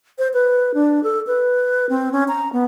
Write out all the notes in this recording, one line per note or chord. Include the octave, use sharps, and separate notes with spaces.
C5
B4
D4
A4
B4
C4
C#4
A#5
B3